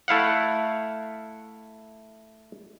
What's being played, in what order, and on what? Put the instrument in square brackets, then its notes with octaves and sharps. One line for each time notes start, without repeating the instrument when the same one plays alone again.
[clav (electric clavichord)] A3 E4 F5 F#5